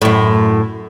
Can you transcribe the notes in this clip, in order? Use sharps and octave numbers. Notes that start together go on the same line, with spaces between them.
F#2 A2